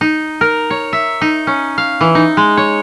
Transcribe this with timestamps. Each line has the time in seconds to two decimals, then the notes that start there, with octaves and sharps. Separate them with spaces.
0.01 D#4
0.41 A#4
0.70 C#5
0.93 E5
1.21 D#4
1.47 C#4
1.78 F5
2.01 E3
2.15 D#4
2.37 G#3
2.57 C#5